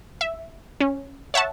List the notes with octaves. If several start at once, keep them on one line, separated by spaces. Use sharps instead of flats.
E5
C#4
C#5 E5 F#5 A5